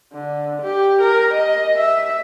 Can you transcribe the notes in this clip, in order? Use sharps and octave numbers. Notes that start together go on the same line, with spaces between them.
D3
G4
A#4
D#5
E5